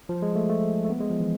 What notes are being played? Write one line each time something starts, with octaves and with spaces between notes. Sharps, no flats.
F3
G#3
A3
A3
A3
B3
G#3
F3
E3